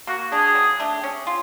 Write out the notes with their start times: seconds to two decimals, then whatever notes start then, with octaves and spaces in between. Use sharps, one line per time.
0.07 A#3 F#4
0.32 D4 G4 G#4
0.55 F#3
0.80 A3 D4 G4
1.04 C#4
1.27 F4